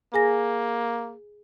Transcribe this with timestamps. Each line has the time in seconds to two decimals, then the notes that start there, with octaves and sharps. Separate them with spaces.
0.14 A#3 G#4 G#5 A#6